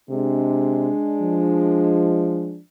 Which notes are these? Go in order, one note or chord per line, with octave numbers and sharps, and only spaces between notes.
C3 G#3 D4
F3